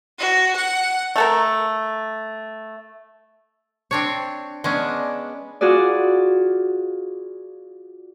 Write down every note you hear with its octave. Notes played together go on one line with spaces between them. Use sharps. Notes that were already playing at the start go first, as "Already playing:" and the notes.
F#4
F#5
A3 A4 A#4
C4 D4 C#5
G#3 B3 C#4 D4
F4 F#4 G#4 B4 D5